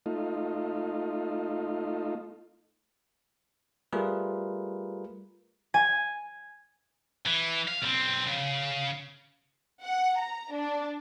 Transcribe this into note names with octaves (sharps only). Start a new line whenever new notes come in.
A3 D#4 F4
G3 A3 F4 G#4 A#4 B4
G#5
E3
F5
B1 C4
C#3
F#5
A#5
D4